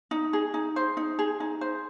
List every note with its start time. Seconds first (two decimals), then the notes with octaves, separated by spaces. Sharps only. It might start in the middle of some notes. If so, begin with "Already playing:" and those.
0.11 D#4
0.33 G#4
0.54 D#4
0.76 C5
0.97 D#4
1.19 G#4
1.40 D#4
1.61 C5